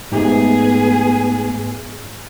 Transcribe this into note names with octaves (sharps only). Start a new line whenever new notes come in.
G#2 A3 B3 G#4